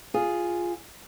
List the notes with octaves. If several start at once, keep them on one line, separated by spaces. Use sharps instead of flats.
F4 G#4